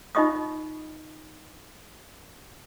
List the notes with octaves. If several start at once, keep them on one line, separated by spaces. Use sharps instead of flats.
D#4 F4 D#5 C#6 D#6